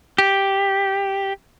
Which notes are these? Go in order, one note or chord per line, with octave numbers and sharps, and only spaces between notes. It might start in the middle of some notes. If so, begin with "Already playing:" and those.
G4